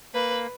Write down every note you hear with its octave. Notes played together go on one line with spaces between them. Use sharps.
A#3 B4